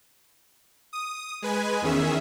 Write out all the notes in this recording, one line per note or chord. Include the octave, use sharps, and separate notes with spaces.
D#6
G#3 B4 G#5
E2 D#3 C#4 G#4 E5